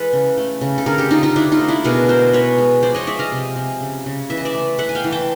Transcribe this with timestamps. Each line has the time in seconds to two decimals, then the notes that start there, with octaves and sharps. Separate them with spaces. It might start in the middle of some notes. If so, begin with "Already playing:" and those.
Already playing: E3 G#3 A4 B4
0.13 C#3
0.38 A3
0.61 C#3
0.78 A4
0.86 D3 G#4 A#4
0.98 G4 A4
1.10 D3 D#4 F4
1.23 D#4 F4
1.36 D3 D4 E4
1.52 D#4 F4
1.59 A3
1.68 D4 E4
1.84 B2 G#4 A#4
2.09 G#3 A#4 C5
2.33 B3 B4 C#5
2.58 G#3
2.82 F3 C5 D5
2.94 C#5 D#5
3.07 G#3 D5 E5
3.19 D#5 F5
3.32 C3
3.56 C3
3.81 C#3
4.06 C#3
4.30 E3 E5
4.37 D#5
4.45 D5 E5
4.55 A3
4.79 A3 E5 F#5
4.89 G#5
4.95 F5 G5
5.04 E3
5.12 G5 A5